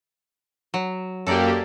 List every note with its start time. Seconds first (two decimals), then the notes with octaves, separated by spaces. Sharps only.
0.74 F#3
1.27 F#2 A#3 G4 A4 D5